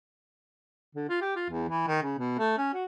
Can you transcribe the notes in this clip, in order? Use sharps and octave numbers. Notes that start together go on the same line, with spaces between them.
D3
F4
G4
F4
E2
E3
D#3
C#3
B2
A3
C#4
F#4